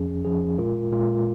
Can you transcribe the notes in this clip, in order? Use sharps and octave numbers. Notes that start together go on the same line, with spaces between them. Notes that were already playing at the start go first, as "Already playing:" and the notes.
Already playing: F2 F3 C#4 G#4
F2 F3 C#4 G#4
A#2 G#3 F4 A#4
A#2 G#3 F4 A#4